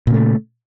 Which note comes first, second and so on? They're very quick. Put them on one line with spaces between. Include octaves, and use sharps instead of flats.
A#2 C#3 A3